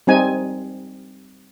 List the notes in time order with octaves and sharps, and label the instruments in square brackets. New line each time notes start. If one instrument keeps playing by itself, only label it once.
[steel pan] G3 C4 D#4 G#5